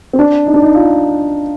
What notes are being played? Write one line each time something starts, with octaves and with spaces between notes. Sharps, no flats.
C4
D4
D#4
D4
D#4
F4